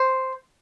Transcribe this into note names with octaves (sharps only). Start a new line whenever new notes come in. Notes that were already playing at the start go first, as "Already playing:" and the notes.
Already playing: C5